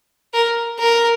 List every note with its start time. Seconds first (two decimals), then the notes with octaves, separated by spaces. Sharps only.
0.34 A#4
0.79 A#4